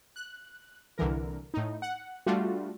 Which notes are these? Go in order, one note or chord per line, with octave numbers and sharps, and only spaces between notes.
F#6
C2 D3 E3 A#4
A2 D#4
F#5
G3 A3 D4 F4 F#4